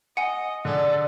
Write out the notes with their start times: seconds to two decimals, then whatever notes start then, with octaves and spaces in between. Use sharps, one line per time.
0.17 D#5 F#5 G#5
0.65 D3 G#4 A4 D5